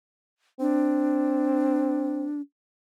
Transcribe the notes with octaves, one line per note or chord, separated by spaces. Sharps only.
C4 D4